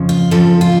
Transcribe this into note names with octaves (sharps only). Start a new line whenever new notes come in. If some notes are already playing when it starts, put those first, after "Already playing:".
Already playing: F2 C#3 F3
F4
F2 C#3 F3 A4
F4